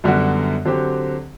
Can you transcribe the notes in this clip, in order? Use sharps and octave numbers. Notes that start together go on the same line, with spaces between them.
F#2 D3 G3 B3 F#4
D3 F#3 C4 G4